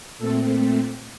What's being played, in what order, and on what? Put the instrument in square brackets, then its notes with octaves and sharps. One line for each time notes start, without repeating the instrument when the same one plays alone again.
[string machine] A#2 A3 C4 A4